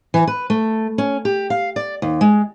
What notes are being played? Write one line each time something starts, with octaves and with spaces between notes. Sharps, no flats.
E3
B4
A3
C#4
G4
F5
D5
D#2
G#3